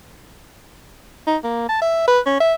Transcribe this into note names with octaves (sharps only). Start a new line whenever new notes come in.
D#4
A#3
A5
E5
B4
C#4
E5